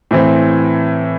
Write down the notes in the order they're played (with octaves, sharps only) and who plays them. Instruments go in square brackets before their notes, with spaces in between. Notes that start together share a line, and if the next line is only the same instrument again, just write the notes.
[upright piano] A2 E3 C4